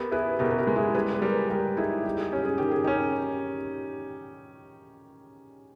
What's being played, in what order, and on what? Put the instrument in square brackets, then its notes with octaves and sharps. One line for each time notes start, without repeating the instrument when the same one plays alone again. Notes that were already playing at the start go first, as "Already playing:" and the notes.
Already playing: [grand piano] B3 [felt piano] G4 A#4
[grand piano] E4 [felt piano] G#4 B4
[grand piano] B2 [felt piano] G4 A#4
[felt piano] B4
G4 A#4
[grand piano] G#3
[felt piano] E4 G#4
[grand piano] G3 [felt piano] G#4 B4
[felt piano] B4
[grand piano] G3 [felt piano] G4 A#4
[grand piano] G3 [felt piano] G4 A#4
[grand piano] D#4 [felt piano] E4 G#4
[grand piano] G3 [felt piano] G4
[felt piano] G#4
[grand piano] C#4 [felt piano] G4
[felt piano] G#4
[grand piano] D#3 [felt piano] G4
[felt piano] G#4
[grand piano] C#4 [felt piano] D#4 G4